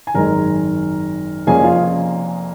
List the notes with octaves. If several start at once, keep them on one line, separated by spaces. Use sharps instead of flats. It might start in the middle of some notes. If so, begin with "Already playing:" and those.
G#5
G#1 F#2 D#3 G#3 A#4 A#5
F1 F2 F3 A#3 C#4 G#4 G#5
F4 F5